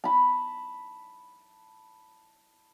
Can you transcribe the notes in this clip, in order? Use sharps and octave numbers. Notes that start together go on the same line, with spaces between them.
A5 B5